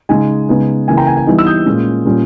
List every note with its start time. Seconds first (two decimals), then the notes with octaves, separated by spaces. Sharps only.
0.09 C#3 G#3 D#4 G#5
0.49 C#3 G#3 B3 D#4
0.88 C#3 E3 A#3 G#5
0.97 G5 A#5
1.07 G#5
1.17 G#5
1.27 E3 G3 B3 D#4
1.39 E6
1.46 D#6 G6
1.66 A#2 G#3 C#4
2.05 A#2 G3 A#3 C#4